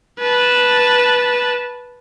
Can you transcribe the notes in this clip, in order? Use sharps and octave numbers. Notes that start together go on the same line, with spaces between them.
B4 A5